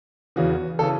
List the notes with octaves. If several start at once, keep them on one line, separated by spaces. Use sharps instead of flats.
E2 C#3 E3 F#4
C#3 E3 A4